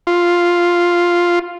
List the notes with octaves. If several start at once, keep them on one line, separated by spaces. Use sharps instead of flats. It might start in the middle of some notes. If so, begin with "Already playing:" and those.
F4